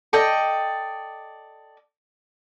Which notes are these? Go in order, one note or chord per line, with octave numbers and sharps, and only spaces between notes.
A4 D5 D#5 G5